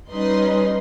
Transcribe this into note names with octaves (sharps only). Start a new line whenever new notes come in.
G3 C#4 D#4 B4 D#5 C6